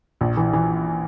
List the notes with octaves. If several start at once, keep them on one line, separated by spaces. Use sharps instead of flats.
A#1
E3
E3